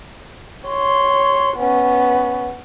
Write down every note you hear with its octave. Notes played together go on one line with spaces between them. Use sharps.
C#5 C6
B3 C#4